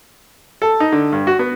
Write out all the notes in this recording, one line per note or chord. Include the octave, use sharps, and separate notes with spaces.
A4
D#4
D3
G2
F#4
B3